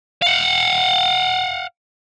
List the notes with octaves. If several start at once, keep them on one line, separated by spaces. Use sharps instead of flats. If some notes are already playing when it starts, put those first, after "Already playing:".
F5 F#5